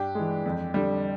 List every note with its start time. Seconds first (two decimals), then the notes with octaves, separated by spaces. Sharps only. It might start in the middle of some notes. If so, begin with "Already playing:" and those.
Already playing: G2 G4
0.15 E3 G#3
0.46 F2
0.74 D3 G3